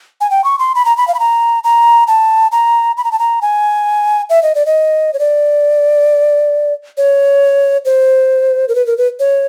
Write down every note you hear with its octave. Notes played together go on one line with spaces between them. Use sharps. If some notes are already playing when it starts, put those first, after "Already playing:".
G#5
G5
C#6
C6
B5
A#5
B5
F5
B5
A#5
A#5
A5
A#5
B5
A#5
A5
A#5
G#5
E5
D#5
D5
D#5
C#5
D5
C#5
C5
A#4
B4
A#4
B4
C#5